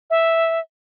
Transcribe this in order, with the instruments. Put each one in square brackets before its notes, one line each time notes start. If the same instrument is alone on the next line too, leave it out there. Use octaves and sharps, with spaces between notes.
[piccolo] E5